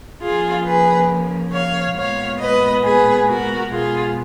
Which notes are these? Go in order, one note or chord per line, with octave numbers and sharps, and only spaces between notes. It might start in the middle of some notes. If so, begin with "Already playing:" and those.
C#3 F3 A#3 F4 G#4
G#4 B4
C#5 F5
A#2 G#3 B3 C#5 F5
B4 D#5
G#4 B4
F#4 A#4
B2 G#3 B3 F4 G#4